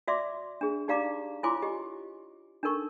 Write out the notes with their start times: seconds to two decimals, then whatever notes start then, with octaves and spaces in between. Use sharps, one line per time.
0.08 F#4 D5 E5 C6 D6
0.61 D4 G#4
0.88 D#4 G4 D5 F5 A#5 D6
1.43 E4 F4 C#5 G#5 C6 D6
1.62 G4 D#5
2.63 D4 D#4 A4 A#4 C#6